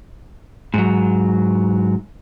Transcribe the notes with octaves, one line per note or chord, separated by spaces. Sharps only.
G#2 F#3